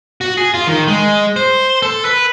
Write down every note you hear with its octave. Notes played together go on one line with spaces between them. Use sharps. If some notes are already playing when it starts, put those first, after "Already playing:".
F#4
G#4
F4
D#3
G#3
C5
A4
B4